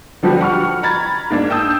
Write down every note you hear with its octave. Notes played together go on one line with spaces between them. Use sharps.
D3 F3 G3 F#4 G4 B4
F#5 C#6 F6
A#5 B5 G#6 A6
G#2 A#3 D4
G5 A5 D#6 E6 G6